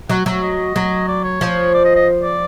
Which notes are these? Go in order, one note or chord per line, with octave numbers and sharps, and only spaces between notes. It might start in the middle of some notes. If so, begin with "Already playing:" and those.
F#3 F#5
F#3 E5
D#5
F#3
D5
C#5
F3
D5
D#5
D#5
D5